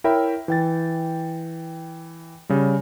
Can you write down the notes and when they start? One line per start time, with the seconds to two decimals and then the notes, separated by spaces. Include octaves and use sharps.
0.04 E4 A#4 C#5 E5 G5 B5
0.48 E3 G5 A6
2.49 C#3 G3